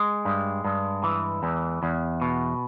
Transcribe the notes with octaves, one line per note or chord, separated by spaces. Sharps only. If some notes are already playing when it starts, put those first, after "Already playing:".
Already playing: G#3
G2
G2
E3
E2
E2
B2